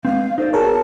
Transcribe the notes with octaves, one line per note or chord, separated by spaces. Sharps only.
G#3 B3 C4 F5
D#4 A4 C5 D5
B3 F#4 G#4 A#4 C#5 A5